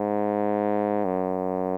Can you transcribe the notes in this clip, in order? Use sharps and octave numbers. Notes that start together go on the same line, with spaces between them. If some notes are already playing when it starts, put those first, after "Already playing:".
Already playing: G#2
F#2